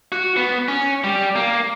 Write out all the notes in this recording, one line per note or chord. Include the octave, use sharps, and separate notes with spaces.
F#4
B3
C#4
G3
A#3